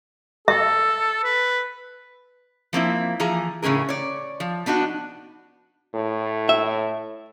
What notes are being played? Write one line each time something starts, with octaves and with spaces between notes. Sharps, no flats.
A4 E5
B4
F3 A#3 C4 E4
E3 F3 G#4 A#5
A2 C#3 C#4 G#4 A#4
C#5 D5
F3
B3 D4 D#4 F#4
A2
E5